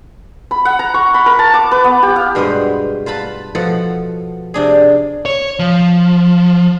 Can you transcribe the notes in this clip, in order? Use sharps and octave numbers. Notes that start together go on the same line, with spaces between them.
B5
F#5
A#5
C#6
B5
A#4
A5
D6
B4
B3
G4
F5
G2 B2 G#3 B4 C5
F4 B4 A5 B5
B2 F3 A4 F#5 A5
C3 D4 G#4
C#5
F3